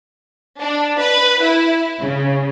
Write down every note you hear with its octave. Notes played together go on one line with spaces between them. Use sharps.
D4
B4
E4
C#3